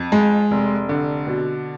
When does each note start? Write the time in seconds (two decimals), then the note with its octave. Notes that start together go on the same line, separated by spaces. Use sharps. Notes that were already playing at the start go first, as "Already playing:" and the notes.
Already playing: F2
0.12 G#3
0.51 F1
0.89 D3
1.27 B2